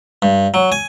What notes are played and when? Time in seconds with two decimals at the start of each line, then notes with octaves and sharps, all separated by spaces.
0.22 G2
0.54 F#3
0.72 G#5